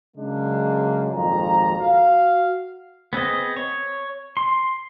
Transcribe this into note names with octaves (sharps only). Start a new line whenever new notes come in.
C#3 F#3 G#3 A#3 D4
G#1 F2 A#2 A#5
F#4 F5
B3 C4 G#4 D#5
C#5
C6